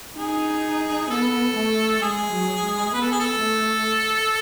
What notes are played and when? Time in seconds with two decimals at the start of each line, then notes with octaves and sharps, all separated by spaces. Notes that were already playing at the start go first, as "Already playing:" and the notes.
0.17 D#4 G#4
1.10 B3 A4
1.57 A3
2.02 G#3 G#4
2.33 F#3
2.63 G#3
2.94 B3 B4
3.02 A4
3.12 G#4
3.20 A4
3.39 A3